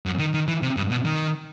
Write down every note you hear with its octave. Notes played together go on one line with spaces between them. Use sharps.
F#2
D#3
D#3
E3
C3
G2
B2
D#3